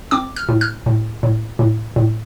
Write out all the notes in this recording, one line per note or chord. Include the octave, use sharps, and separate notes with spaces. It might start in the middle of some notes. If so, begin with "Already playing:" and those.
C4 D6
F6
A2
F6
A2
A2
A2
A2